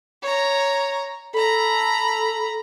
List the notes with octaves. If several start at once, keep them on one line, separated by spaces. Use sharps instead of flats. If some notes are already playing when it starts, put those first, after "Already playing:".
C#5 A#5
A4 A#5 B5